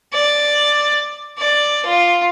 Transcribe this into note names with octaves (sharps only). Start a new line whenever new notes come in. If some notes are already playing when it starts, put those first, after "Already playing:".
D5
D5
F4